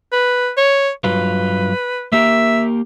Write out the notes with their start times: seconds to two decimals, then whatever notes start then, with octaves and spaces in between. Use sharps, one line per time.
0.12 B4
0.57 C#5
1.04 G2 F#3 F4 B4
2.12 A#3 G4 A#4 E5